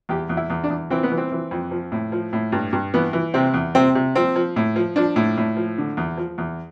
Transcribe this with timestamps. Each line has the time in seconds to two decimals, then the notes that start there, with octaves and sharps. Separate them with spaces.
0.09 E2 G4
0.29 E2
0.37 E4
0.50 E2
0.64 D4
0.70 E2
0.90 E3 C4
1.03 B3
1.12 E3
1.18 C4
1.32 E3
1.51 F2
1.71 F3
1.92 A2
2.12 F3
2.33 A2
2.52 G2
2.73 G2
2.94 E3 B3
3.13 E3
3.34 C3 C4
3.54 E2
3.75 C3 C4
3.95 C3
4.16 F3 C4
4.36 F3
4.56 A2
4.76 F3
4.96 F3 D4
5.16 A2
5.37 A2
5.57 F3
5.78 D3
5.97 E2
6.17 F3
6.38 E2